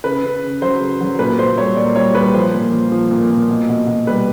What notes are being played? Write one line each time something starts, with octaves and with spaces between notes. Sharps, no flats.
C#3 B4
C#3
C#3
F#3 C5
C#3
F#3
A#2 B4
A#2 C5
G3 C#5
A#2 D5
G3 C#5
G3 B4
F3 C5
A#2
F3
F3
A#2
A#2
B2
B2
B2
G3 B4